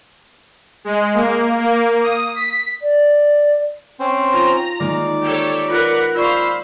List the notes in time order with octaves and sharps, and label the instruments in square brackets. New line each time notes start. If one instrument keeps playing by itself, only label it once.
[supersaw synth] G#3
A#3
A#3
D#6
B6
[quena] D5
[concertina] C4 C#4 C5
[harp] F4 [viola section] A#5
[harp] D#3 G#3 A#3 [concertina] D5
[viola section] G4 A4 C#5
[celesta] F4 C#7 [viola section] A#4 B4 F#5
[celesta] F4 D5 C#6 [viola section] C5 F5 [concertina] B5 E6